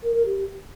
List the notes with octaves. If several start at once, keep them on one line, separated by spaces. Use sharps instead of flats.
A#4
A#4
G4